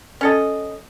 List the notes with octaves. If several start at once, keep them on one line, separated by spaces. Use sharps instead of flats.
C#4 A4 D#5